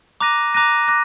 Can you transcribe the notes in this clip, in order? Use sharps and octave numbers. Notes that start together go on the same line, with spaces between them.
A#5 D6 F#6 A#6 D#7
A#5 D6 F#6 A#6 D#7
D6 F#6 A#6